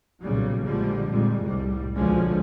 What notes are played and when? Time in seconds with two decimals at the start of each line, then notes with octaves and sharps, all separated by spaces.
0.22 B1 A#2 C#3 F#3 G3
0.64 A#1 A#2 D3 F3 G3 G#3
1.10 F2 A#2 G3 G#3
1.41 F1 C2 A2 G3
1.96 D2 B2 D3 F3 G#3 C#4